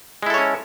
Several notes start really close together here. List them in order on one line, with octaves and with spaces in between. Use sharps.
G#3 E4 A4 C#5 C#4